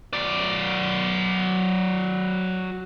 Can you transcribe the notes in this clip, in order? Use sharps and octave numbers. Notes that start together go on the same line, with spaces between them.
F#3 D5